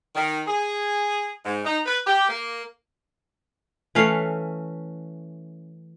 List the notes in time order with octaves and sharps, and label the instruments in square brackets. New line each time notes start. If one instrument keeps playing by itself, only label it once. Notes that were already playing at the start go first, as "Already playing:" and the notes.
[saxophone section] D#3
G#4
G#2
D#4
B4
G4
A#3
[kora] E3 A3 C#4 F5